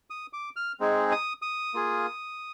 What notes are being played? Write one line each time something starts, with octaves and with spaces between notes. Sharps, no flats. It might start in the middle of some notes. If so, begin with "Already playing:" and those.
D#6
D6
F6
G#3 C4 D#4 G#4
D#6
D#6
A#3 F4 G#4